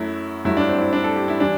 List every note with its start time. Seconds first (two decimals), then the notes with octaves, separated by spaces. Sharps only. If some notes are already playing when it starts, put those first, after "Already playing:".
Already playing: F#2 F#3 A3 E4
0.45 G2 F#3 A3 E4
0.57 D4
0.69 C4
0.81 E4
0.93 D4
1.04 A4
1.16 G4
1.28 E4
1.40 E3 G3 D4